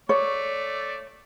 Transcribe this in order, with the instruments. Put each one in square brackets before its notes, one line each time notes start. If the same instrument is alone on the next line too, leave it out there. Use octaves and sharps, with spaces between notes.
[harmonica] A3 D5 [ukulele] C#5